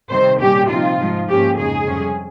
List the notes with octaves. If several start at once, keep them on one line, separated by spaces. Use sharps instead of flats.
C3 D#3 G3 C4 C5
A#2 G3 C#4 G4
C3 F3 C4 D#4 F4
G#2 F3 G#3 D#4
G#2 F3 A#3 C#4 G4
F2 C#3 G#3 D#4 G#4
F2 C3 G3 C#4